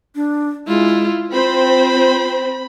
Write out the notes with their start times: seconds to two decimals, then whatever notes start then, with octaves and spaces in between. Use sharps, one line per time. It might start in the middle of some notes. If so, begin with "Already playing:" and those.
0.15 D4
0.67 G#3 E4 F4
1.33 C4 F4 C5 B5